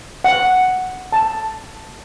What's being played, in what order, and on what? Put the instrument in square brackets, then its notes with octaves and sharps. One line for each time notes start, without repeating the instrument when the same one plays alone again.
[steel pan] F#5
A5